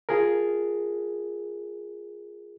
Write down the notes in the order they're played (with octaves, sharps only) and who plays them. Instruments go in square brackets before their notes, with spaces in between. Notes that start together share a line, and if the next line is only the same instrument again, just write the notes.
[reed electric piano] F4 G#4 A#4